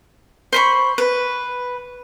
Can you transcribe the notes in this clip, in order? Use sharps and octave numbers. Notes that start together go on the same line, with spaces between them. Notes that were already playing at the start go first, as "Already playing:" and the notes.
C5 B5 C#6
B4